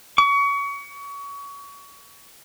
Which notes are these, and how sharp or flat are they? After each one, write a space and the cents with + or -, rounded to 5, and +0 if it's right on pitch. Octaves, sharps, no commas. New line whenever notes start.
C#6 +30